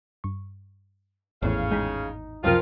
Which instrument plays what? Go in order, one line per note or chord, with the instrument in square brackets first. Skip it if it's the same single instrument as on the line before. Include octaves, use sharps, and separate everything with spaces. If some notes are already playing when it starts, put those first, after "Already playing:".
[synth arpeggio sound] G2 C#6
[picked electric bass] G#1 E2 A2 [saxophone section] C#3 C#5 F5
[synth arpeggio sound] G#3 G#4 B6 [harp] D#4
[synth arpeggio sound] C#2 F#2 C3 [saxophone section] D#3 F4 [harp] F3 A#4